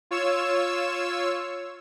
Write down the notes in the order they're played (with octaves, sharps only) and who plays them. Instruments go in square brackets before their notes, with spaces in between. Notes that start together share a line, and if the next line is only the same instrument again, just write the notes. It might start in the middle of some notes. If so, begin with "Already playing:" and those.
[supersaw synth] F4 C#5 E6